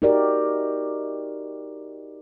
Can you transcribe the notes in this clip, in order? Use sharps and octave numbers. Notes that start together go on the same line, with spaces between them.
D#4 F#4 G4 A#4 D5